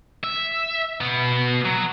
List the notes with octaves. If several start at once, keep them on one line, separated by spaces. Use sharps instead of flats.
E5
B2 B3
F#3